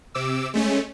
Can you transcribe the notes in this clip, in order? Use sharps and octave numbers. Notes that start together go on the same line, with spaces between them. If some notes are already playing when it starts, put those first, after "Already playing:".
C3 D6 E6
G#3 A3 C#4